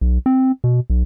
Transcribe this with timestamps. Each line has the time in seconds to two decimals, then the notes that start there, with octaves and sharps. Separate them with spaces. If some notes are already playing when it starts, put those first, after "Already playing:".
0.01 B1
0.26 C4
0.64 B2
0.90 B1